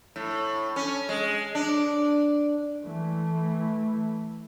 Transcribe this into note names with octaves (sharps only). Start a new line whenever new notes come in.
A2
C#4
G#3
D4
E3 A3